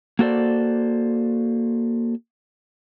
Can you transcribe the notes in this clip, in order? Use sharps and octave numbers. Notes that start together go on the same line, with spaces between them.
A#3 F#4 A4 C5 D5